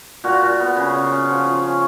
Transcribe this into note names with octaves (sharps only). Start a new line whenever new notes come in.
A#2 F#4 A#4
A#2
B3
C#3
C#3
C#4
F3
F3
C#4